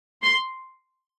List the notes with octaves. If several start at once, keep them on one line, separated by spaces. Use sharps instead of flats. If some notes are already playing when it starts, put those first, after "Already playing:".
C6